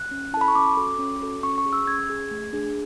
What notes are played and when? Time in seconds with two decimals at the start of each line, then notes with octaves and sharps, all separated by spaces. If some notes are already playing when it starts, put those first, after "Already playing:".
Already playing: F#6
0.11 C#4
0.33 E4 A5
0.37 A4 B5
0.48 C#6
0.55 C#4 D6
0.77 F#4 A4
0.99 C#4
1.21 F#4 A4
1.43 C#4 C#6
1.58 C#6
1.66 G#4
1.73 E6
1.87 C#4 G#6
2.10 G#4
2.31 A3
2.53 D4 G#4